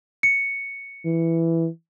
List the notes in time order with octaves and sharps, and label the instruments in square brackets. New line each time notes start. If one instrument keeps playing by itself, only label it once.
[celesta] C#7
[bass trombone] E3